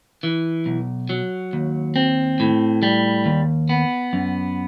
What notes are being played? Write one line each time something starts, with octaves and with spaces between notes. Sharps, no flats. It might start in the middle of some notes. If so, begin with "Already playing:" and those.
E3
B1
F#3
D#2
C4
A2
G3
D#2
B3
F#2